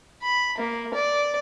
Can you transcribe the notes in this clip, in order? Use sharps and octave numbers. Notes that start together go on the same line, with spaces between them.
B5
A#3
D5